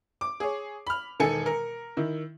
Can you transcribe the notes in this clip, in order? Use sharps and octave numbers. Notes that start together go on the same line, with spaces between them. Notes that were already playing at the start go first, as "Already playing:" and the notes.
D6
G#4 C#5
B5 F6
E1 D#3 A4 G#5 C#7
A#4
D#3 E4